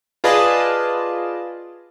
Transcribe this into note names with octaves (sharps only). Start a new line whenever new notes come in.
F4 G#4 B4 D5 D#5 A5